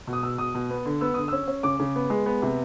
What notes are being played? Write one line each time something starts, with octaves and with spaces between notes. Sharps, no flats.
B2
D#6
B2 E6
B2 D#6
B2
B3
D3
B3 E6
D3 D#6
C#4 E6
C#4
C#3 D6
C#3
B3
G#3
B3
C3